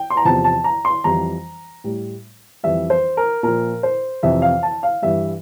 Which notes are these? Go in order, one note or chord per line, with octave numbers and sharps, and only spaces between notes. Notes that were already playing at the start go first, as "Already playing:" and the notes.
Already playing: G5
C6
A#5
E2 C3 F3 A5
A5
A#5
C6
F2 E3 G3 A#5
A2 G3
F2 E3 G3 E5
C5
A#4
A#2 F3 A#4
C5
F2 C3 E3 E5
F5
A5
F5
G2 E3 G3 E5